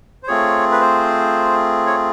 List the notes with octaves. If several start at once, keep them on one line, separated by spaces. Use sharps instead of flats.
C5
A3 C4 F4 G#4 C#5
B4
C5
C#5